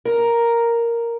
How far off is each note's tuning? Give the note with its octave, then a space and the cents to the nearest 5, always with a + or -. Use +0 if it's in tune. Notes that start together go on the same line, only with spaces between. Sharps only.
A#4 +0